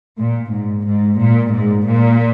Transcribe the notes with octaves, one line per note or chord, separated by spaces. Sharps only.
A#2
G#2
G#2
A#2
G#2
A#2